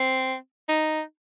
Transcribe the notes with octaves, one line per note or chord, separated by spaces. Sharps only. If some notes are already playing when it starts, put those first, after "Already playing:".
Already playing: C4
D#4